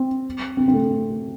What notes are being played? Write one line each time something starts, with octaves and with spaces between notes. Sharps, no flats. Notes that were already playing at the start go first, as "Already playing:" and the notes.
Already playing: C4
C4
C4
A3